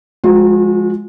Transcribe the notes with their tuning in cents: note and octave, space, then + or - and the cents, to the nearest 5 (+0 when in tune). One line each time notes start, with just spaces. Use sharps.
F3 +0 G#3 +0 F#4 -40